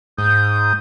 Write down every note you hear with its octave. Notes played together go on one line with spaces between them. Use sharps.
G#2 D#6 G6